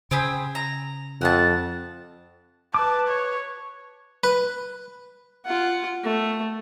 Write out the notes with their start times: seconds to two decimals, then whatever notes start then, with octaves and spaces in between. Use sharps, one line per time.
0.11 C#3 C4 G#4 B5
0.55 A#5
1.21 F2 F#5 G#5 A5
2.74 B4 A5 D6
3.08 C#5
4.24 B4
5.45 F4 F#5
6.04 A3